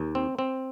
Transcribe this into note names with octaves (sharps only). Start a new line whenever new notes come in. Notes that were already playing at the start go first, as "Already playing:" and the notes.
Already playing: D#2
C4
C4